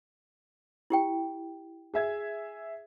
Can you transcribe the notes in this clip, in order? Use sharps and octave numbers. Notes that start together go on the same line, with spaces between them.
E4 G4 G5
G#4 E5 G#6